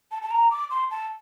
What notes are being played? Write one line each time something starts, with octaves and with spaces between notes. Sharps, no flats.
A5
A5
A#5
D6
C6
A5